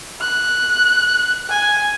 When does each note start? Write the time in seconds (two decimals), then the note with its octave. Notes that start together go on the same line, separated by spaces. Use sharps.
0.21 F#6
1.49 G#5